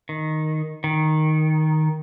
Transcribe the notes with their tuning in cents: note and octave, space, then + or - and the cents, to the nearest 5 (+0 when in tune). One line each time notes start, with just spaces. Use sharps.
D#3 +0
D#3 +0